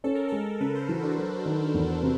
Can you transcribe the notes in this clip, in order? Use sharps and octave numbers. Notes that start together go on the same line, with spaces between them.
C#4 A4
A#4
G#3 A4
C#3 B4
C5
E3 F#4
D4
F#3
D#3
E2
C3